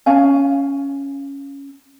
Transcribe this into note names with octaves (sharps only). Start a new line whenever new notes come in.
C#4 F5 G#5